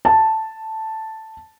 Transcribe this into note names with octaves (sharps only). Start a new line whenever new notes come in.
A5